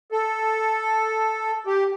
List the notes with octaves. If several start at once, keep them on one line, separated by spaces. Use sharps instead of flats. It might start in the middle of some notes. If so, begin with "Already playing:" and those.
A4
G4